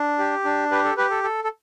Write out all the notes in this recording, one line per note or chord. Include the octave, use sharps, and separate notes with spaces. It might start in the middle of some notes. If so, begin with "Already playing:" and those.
Already playing: D4
G4
D4
G4 B4
A4
G4 B4
A4
A4
A4